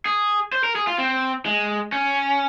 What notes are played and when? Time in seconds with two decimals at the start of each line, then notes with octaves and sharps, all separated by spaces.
0.05 G#4
0.53 C5
0.64 A#4
0.75 G#4
0.87 F4
0.98 C4
1.46 G#3
1.92 C#4